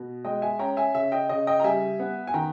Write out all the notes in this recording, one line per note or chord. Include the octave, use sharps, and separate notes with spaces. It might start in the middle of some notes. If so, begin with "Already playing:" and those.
Already playing: B2
G#3 D#5 G5
E5 G#5
C#4 G5 A#5
E5 G#5
C#3 E5
D#5 G5
C#3 D#5
D#5 G5
A#5
G3 E5 G#5
B3
G#5
D#3 G5 A#5